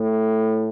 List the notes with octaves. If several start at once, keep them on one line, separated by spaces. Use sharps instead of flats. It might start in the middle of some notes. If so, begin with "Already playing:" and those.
Already playing: A2